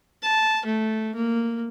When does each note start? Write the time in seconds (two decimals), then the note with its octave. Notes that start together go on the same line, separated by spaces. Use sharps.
0.23 A5
0.66 A3
1.15 A#3